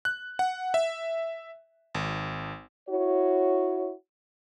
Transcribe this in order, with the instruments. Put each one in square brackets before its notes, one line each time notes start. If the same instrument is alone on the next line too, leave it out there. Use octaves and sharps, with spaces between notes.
[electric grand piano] F#6
F#5
E5
G#1
[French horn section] E4 F#4 C#5